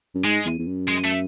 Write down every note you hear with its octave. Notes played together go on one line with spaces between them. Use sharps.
F#2
G#2 G#3
E2
E2
F#2
G#3
A3